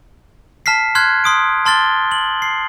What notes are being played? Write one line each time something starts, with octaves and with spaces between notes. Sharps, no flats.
A5 F6 B6 C7
C6 F6 F#6 G#6
C6 D#6 D7
A5 C6 F6 A6 G7
F#7
C7